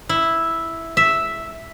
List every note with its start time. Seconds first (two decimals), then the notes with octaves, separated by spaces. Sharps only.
0.09 E4
0.97 E5